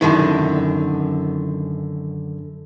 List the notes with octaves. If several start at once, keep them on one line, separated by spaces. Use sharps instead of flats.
F#2 B2 D3 D#3 E4